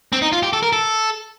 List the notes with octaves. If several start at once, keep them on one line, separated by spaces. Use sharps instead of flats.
C4
D#4
F4
G4
A4
A#4
A4